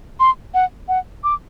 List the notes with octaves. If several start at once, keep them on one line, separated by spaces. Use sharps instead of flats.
C6
F#5
F#5
D6